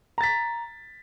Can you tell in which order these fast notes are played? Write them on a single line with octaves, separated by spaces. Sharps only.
A#5 A6 B6